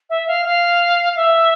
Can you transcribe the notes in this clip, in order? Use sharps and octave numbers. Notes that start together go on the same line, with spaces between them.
E5
F5
F5
E5